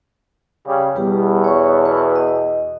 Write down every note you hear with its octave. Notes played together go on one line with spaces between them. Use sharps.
C#3 G3
E2 B2 G3 B3 G4
C#5 C#6
B4
D#5